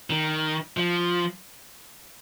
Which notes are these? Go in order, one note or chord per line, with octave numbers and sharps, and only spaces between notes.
D#3
F3